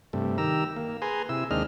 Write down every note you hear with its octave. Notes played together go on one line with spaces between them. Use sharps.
G2 C3 A3
D#3 G4 A#5 E6
A#3
G#4 B4 G#5 A#5 C6
C3 E4 E6
D#2 G#3 C4 D4 D#5 F6